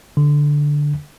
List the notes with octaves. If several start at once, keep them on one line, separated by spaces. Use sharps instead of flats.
D3